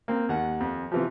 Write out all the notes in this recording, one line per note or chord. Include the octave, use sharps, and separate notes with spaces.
A#3 C4
D#2 F#5
F2
C3 E3 F3